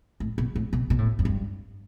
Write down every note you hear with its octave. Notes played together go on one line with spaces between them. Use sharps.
A2
B2
A2
B2
B2
A2
F#2
G2